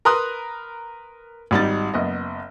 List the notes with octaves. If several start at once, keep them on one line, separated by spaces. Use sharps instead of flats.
A#4 B4 A#5 C6 D#6 F#6
G#1 G3 D#4 A6
F#1 B3 D#5